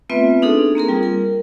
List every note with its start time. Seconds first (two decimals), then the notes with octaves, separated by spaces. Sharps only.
0.10 A3 B3 C4 F4 B4 E5
0.42 D4 D#4 G#4 A4
0.75 A#3 C4 G#4 A#4
0.88 G3 F4
1.03 A#4